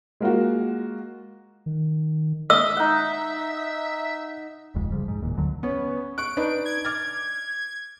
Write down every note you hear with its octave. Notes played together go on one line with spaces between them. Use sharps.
G#3 A#3 F4 F#4
D#3
D#5 E5 E6
D#4 F#5
D#1 C2 F2 G#3
C#3 F3 G3
G#2
E1 D#2 A#2
D2 D3 F#3
B3 C#4
C#6 F#6 D7
D4 D#4 B4
G#6
D6 F6 A6